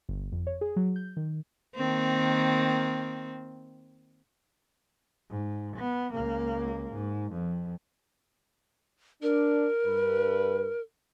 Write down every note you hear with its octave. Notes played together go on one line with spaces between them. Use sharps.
G1
F2
C#5
G#4
F#3
G6
D#3
D#3 A#3 C4
G#2
B3
C#2 A#3
G#2
F2
D4 A#4
G2 B4